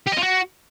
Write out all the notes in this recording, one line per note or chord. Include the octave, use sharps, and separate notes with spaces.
G4
D#5
F4
F#4